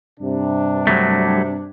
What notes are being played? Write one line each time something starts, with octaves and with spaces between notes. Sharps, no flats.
G2 C3 D4
F#3 G3 A3